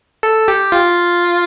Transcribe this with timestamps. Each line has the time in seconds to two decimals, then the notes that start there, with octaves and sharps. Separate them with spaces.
0.23 A4
0.48 G4
0.72 F4